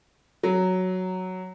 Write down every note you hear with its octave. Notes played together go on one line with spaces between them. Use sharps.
F#3